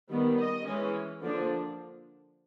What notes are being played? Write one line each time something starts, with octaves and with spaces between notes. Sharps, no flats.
D#3 G3 B3
D#5
E3 G#3 C#4
D3 F3 A#3 D4